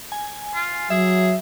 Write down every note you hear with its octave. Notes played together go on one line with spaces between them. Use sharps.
G#5
F4
F#3 G#4 E5